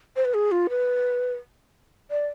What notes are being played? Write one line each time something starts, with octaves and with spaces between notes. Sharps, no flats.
C5
B4
G#4
F4
B4
D5